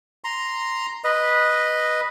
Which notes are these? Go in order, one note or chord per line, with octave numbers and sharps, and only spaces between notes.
A#5 C6
B4 D#5